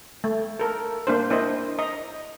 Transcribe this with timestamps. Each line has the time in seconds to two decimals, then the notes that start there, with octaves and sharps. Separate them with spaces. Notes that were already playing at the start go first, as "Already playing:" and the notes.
0.24 A3
0.59 A4 A#4
1.07 A#3 D4 C5
1.30 D4 E4 C5 D#5
1.79 D#5 A#5